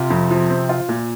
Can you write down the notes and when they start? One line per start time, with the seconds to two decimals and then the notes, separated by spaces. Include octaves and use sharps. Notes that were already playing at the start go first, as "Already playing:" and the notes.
Already playing: C3 F4
0.10 F2
0.31 F3
0.50 C4
0.69 F4
0.89 A#2